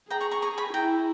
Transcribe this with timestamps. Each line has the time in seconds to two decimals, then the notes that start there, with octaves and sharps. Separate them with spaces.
0.10 G#4 G5 A#5
0.21 A#5 C#6
0.31 A#5 C#6
0.42 A#5 C#6
0.58 G#5 B5
0.73 E4 G5 A#5